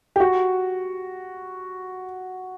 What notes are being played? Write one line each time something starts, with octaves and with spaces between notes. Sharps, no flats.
G4
F#4